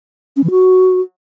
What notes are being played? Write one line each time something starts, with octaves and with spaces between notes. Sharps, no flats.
C#4
E3
F#4